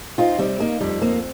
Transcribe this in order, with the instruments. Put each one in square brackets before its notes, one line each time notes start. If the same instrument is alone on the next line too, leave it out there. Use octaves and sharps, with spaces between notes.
[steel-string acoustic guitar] C4 F4 [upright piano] D#4
[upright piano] C3 [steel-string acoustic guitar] G3 C4
[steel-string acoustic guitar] A#3 [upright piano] D#4
[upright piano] F2 [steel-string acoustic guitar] G3
[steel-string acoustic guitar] A#3 [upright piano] C4